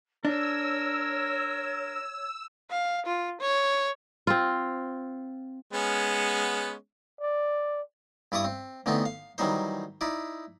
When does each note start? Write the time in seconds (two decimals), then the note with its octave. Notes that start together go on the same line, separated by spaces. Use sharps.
0.25 D4 A#4 C#5 E6
2.70 F5
3.06 F4
3.41 C#5
4.27 C4 F4
5.73 G#3 B3 C#4
7.21 D5
8.32 G2 E4 D5 C#6 D#6
8.44 C4
8.86 D3 E3 A3 B3 C4 D#4
9.05 F5
9.38 D#3 E3 F#3 G3 D#4 C5
10.01 D#4 E4 D5